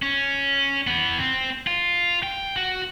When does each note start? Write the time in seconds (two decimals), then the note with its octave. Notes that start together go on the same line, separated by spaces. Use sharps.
0.02 C#4
0.87 E3 B3
1.19 C4
1.67 F4
2.23 G5
2.56 F#4